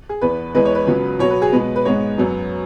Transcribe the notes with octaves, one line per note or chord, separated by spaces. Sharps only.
G#4
E2 E3 B3 B4
E2 E3 G#3 B3 B4
C#5
B4
C#2 C#3 F#3 B3
B2 F#3 B3 C#5
B4
G#4
B2 G#3 B3 B4
B4
G#2 G#3 B3 C#5
F#2 F#3 B3